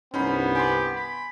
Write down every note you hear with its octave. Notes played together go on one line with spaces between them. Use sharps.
C2 G2 B3 C#4 D#4 C5 B5
G4 G#5 C6
B5